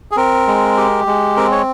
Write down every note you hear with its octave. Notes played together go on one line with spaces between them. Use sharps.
G#4
C4 A#4
G#3
G4
G#3
C4 A#4
C#5